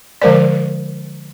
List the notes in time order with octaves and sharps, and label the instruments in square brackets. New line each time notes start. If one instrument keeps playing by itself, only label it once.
[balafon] D3 F3 G#3 A#4 C5 D5